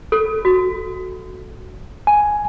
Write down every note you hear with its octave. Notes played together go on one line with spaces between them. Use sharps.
A4
F#4
G#5